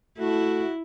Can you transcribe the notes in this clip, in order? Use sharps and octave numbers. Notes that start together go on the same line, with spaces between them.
A3 E4 F#4